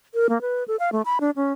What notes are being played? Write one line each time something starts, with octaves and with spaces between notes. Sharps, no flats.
A#4
A#3
B4
A4
F5
A3
B5
D4
C#4